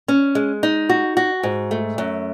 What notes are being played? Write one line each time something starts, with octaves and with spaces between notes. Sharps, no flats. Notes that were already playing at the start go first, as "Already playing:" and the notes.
C#4
G#3
D#4
F#4
F#4
G#2
A3
F#2